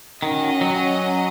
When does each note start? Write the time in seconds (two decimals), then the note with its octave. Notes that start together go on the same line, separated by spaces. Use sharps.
0.22 D#3 C#4 F#4 D#5
0.61 F#3